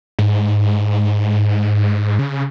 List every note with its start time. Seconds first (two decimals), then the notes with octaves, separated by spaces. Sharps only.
0.19 G#2
2.19 C#3